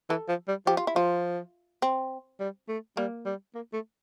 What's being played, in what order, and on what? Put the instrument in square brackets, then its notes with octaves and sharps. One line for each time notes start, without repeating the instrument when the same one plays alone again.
[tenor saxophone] E3 [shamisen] A4
[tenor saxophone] F3
G3
[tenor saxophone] F3 [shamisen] G4
[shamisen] F4
E4
[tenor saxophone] F3 [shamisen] F4
[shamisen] C4
[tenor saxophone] G3
A3
[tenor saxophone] G3 [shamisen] A#3
[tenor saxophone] G3
A#3
A3